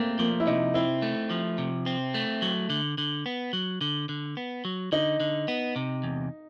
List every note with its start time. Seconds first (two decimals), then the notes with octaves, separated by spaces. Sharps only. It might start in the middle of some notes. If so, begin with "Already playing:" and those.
Already playing: A3 A#3 C4
0.19 F3 A#3
0.40 E4
0.47 C3 D#4
0.74 C4 E4
1.02 A3
1.30 F3
1.58 C3
1.86 C4
2.14 A3
2.42 F#3
2.70 D3
2.98 D3
3.26 B3
3.53 F#3
3.81 D3
4.09 D3
4.37 B3
4.65 F#3
4.92 D3 D#4
5.20 D3
5.48 B3
5.76 C3
6.03 E2